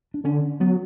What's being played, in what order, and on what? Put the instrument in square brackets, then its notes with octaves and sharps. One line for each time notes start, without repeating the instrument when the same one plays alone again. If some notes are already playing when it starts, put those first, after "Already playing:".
[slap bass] D4
[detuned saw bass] D3 [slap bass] C#4
[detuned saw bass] F#3 [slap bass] B3